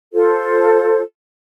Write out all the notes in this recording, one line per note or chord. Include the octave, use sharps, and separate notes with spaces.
F4 A4 C5